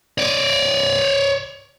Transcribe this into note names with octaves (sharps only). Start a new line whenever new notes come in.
C#5 D5